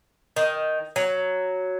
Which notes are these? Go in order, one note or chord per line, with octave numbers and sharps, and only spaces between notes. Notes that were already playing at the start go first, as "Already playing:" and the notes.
D#3
F#3